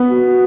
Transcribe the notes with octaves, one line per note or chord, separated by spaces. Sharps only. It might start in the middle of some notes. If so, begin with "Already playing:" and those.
Already playing: B3
F#4